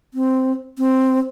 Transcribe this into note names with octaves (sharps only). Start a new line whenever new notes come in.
C4
C4